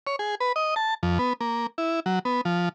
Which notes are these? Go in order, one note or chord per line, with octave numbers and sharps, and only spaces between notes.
C#5
G#4
B4
D#5
A5
F2
B3
A#3
E4
F#3
B3
F3